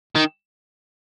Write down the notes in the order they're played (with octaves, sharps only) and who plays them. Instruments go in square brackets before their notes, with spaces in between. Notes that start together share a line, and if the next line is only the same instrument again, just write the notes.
[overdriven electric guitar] D#3